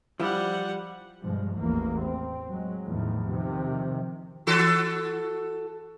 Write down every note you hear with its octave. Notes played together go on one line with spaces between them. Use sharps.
F3 G3 E4 F#5
G2 B2 F3 G#3
A1 E2 E3 A#3
C4
F#3 G#3
E2 A2 D#3 F3
C3 D#3 F3
E3 F#4 A4